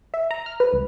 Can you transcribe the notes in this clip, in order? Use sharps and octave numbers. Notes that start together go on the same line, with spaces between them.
E5
A#5
F6
B4
C#2